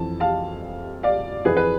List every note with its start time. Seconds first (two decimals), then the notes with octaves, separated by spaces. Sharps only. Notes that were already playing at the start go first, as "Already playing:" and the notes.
Already playing: F2 E3 A5
0.20 F5 A5
1.03 D5 F5
1.45 F2 E3 G#4 B4
1.57 B4